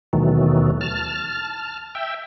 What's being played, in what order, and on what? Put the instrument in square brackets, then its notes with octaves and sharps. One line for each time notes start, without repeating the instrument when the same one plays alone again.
[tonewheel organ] D#2 B2 D#3 E3 F#3 A3
A5 F6
E5 G5